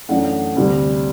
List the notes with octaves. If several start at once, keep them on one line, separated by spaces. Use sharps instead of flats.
F#2 E3 A3 D4 F#5
F#5
D2 C3 G3